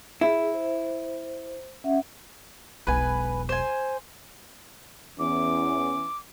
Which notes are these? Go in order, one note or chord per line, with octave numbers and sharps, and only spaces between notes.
E4 G#4
C5
C#4 E5 F#5
E1 B1 B4 G#5
C5 G#5
E2 E3 B3 C#4 D6